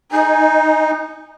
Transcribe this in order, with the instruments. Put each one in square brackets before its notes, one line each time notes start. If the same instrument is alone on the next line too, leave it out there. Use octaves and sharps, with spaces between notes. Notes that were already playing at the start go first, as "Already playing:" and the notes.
[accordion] D#4 [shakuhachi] G#5